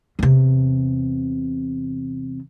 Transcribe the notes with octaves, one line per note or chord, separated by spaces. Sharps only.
E2 C3